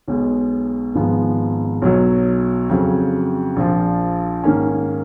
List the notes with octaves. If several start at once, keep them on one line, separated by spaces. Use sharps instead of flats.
B1 B2 G#3
G#1 G#2 F3 G#3 B3
B1 B2 F#3
F2 C#3 F#3
A#1 A#2 F3
G#2 D#3 A#3 C#4